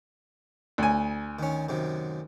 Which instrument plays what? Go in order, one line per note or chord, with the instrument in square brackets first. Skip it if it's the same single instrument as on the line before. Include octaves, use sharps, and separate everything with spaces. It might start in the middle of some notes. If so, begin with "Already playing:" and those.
[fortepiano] D2 G#5
[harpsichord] D#3 C#4
F#2 C3 D#3